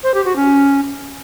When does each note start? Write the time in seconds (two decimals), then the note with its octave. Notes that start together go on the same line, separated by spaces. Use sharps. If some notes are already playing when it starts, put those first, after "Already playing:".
0.03 C5
0.14 G4
0.25 F#4
0.36 C#4